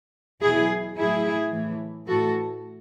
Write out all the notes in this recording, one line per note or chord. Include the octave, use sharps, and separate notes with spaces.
E2 B2 F#3 E4 G#4
A2 F#3 E4 G#4
A2 E3
A2 E3 F#4 A4